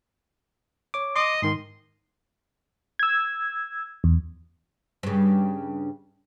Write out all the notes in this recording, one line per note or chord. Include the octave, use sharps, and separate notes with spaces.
C#5 D6
D#5 C6 D6
G#2 D#3 C6
E6 G#6
E2
G2 C#3